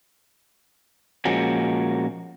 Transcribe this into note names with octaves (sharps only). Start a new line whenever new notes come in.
A#2 F3 G#3 A#3 C#4 F#4